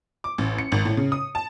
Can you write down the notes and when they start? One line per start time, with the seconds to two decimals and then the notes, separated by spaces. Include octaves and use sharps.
0.24 D6
0.38 A1
0.58 C#7
0.72 G#1
0.85 A2
0.97 C#3
1.12 D#6
1.35 A5